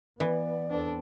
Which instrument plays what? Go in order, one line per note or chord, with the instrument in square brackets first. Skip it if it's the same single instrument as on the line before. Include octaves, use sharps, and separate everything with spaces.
[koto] E3 [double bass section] B3 [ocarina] D5
[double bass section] E2 B3 C4 [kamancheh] D4 A4